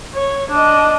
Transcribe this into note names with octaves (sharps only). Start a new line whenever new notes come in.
C#5
D4 D#5